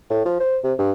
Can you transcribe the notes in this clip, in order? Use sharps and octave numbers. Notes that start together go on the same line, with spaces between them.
A2
F3
C5
C3
G2